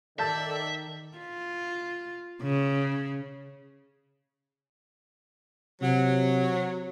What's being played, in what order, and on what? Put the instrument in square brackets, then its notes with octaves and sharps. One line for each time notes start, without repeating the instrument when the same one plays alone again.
[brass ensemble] D#3 [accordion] A4 D5 [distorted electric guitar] E5 [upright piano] A5 G6 A6
[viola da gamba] F4
C#3
[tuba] C3 [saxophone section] F#3